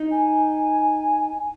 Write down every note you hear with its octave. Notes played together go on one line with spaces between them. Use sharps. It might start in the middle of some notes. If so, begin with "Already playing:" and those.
Already playing: D#4
G#5